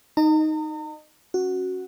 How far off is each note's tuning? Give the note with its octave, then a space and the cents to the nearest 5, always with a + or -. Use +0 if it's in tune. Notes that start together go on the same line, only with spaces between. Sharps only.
D#4 +0 D#5 -35 A#5 -40
C#4 -20 F#4 +0